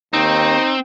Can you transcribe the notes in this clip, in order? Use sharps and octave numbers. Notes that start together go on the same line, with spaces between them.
D#2 C4 D#4